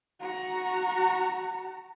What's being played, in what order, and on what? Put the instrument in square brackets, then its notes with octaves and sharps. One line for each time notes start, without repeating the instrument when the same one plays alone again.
[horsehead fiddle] F#4 A#5